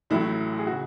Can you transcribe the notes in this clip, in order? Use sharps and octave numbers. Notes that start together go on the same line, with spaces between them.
A1 A2 F#3 A3 E4
G#4
C#3 F#4